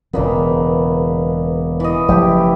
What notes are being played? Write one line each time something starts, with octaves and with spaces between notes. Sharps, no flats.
E1 A#2 C#3 A#3 B3
E3 D#5
F#1 F3 A3 E4 G4